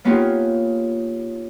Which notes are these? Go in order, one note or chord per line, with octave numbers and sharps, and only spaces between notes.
A#3 B3 C#4 D#4 F4 G4